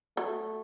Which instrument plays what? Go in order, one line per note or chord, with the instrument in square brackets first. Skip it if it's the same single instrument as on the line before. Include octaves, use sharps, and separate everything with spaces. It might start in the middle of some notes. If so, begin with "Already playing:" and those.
[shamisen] F#3 [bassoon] A3